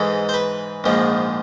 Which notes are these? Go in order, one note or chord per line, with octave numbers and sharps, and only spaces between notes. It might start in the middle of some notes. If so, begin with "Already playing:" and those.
Already playing: G#2 E3 G#3 A4
C5
B4
A#1 G#2 F3 G#3